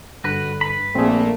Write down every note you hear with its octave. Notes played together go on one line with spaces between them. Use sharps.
G2 D3 F#4 B4
B4 B5
A#1 A#2 A3 A#3 C4 G#4